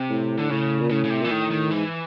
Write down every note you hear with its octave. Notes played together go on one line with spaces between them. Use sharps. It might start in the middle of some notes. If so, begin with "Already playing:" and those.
Already playing: C3
A2
D3
A2 C#3
A#2
A2 C#3
C#3
C3
A#2 E3
A2 D#3
D#3
G#2 E3